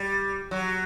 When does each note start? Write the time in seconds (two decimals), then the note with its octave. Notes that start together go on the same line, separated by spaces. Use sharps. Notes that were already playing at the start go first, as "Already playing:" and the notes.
Already playing: G3
0.51 F#3